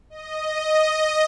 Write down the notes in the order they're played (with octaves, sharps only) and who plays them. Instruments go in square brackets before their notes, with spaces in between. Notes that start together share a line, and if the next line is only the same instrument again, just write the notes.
[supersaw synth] D#5